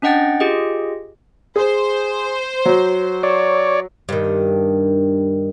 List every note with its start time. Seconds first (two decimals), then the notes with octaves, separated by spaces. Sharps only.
0.02 C#4 D4 D#5 F#5 G5 A6
0.40 F4 G4 G#4 D#5
1.56 G#4 C5
2.66 F#3
3.23 C#5 D5
4.09 G2 D#3